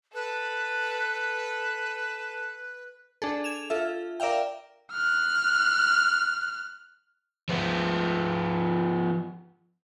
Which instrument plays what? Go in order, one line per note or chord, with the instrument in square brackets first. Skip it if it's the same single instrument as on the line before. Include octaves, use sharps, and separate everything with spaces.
[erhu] A4 [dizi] B4
[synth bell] D4 G#4 A4
G#6 E7 F7
F4 A4 E5
A#4 D5 E5 F5 G5
[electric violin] F6 F#6
[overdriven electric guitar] F3 B3